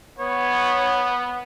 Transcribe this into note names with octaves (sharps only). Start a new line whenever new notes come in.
B3 C#5